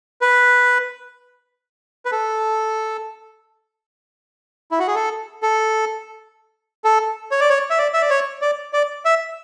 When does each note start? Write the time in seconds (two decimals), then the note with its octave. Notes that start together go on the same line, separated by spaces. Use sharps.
0.21 B4
2.05 B4
2.12 A4
4.71 E4
4.79 F#4
4.87 G#4
4.95 A4
5.42 A4
6.84 A4
7.31 C#5
7.40 D5
7.50 C#5
7.70 E5
7.78 D5
7.93 E5
8.02 D5
8.10 C#5
8.42 D5
8.73 D5
9.05 E5